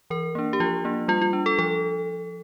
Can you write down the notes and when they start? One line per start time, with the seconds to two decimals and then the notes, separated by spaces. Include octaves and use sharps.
0.10 E3 A#4
0.35 A#3 D4
0.53 G4
0.60 F3 F4
0.85 A#3 D4
1.08 G3 F4
1.21 F4
1.33 D4
1.46 A4
1.59 F3 A4